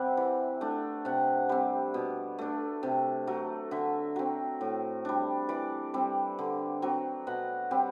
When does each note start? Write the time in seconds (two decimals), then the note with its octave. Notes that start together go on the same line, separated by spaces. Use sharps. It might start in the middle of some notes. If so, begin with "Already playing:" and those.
Already playing: C3 G3 C4 E5 F#5
0.17 E3
0.61 A3 D4
1.05 C3 F#5
1.49 G3 C4
1.94 B2
2.38 A3 D4
2.83 C3
3.27 F#3 A3
3.71 D3 E5
4.16 F#3 C4
4.61 A2
5.05 G3 D4
5.49 E3 D5
5.94 G3 C4
6.39 D3
6.82 F#3 C4
7.27 B2 F#5
7.71 G3 C4